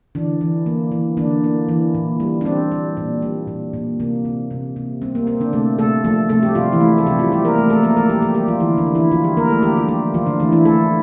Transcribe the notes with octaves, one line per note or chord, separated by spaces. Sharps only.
D3 E3 D4
E3
A#3
E3
D3 A#3 D4
A#3
E3
A#2
G3
D4
G3 C4
G3
A#2
G3
A#2
A#2
C3 A#3
C3
C3
C3
G3 C4
A#3
A#3 C4
D3 D4
C3 A3 A4
C3 A3 A4
F3 A3 A4
C3 A3 A4
G3 G4
C3 F3 F4
E3 E4
A3
A4
C3 G3 G4
F3 F4
F3 G3 G4
A#3 A#4
A3
A3 A4
F3 A#3 A#4
A3 A4
G3 A#3 G4
G3 G4
G3 A#3 G4
F3 F4
D3 E3 E4
D3 D4
F3
E3 E4
D3 F3 F4
G3 G4
D3 A#3 A#4
A3 A4
D3 G3 G4
F4
F3 G3 G4
D3 F3 F4
D3 D4
E3 A3 E4
E3 E4
A3 A4